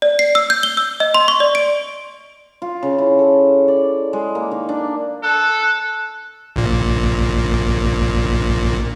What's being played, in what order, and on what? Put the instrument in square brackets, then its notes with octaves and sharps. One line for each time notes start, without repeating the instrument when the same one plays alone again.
[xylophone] D5
C7
E6
G6
G7
E6
D#5
C6
C#6
D5
D7
[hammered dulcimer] F4
C#3
E4
A4
D5
G#3
A#3
D#3
D4
[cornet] A4 [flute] F#6
[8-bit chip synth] A#1 A#2